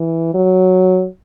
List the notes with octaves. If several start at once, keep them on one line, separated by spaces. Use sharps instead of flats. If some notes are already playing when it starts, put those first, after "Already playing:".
Already playing: E3
F#3